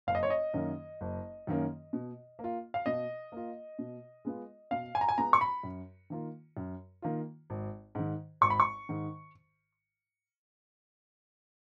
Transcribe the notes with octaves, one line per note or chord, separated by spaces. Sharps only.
F#1 F5
D#5
C#5
D#5
F#2 D#3 A#3 C#4
F#1
F#2 D#3 A#3 C#4
B2
A#3
F4
F5
B2 D#5
A#3 F4
B2
G#3 B3 F4
B2 F5
G#5
A#5
G#5
G#3 B3 F4 A#5
C#6
B5
F#2
D#3 A#3 F4
F#2
D#3 A#3 F4
G#1
G#2 D#3
G#1 C#6
B5
C#6
G#2 D#3